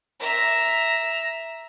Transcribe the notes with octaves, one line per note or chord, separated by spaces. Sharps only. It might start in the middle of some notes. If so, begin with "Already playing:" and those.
E5 A#5